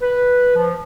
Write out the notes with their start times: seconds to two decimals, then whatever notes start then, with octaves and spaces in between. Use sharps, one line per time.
0.01 B4
0.55 F3